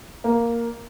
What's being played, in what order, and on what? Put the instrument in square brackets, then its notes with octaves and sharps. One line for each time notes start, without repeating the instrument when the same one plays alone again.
[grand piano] A#3